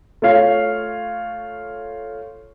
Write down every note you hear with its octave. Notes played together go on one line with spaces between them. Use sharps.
A3 F4 C#5 F5